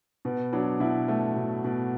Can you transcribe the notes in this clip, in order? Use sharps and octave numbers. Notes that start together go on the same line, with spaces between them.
B2 B3
F#3 D4
B2 E4
B2 A3
B2
B2